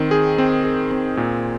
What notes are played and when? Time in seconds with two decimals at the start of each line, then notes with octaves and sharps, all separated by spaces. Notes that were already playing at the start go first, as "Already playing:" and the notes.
Already playing: D#3 C4
0.11 G#4
0.38 C4
0.64 G#4
0.91 C4
1.17 A#2